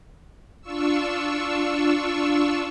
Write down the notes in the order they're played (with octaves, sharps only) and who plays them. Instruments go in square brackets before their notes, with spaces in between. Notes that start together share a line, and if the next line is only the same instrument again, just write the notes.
[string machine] D4 F4 C#6 E6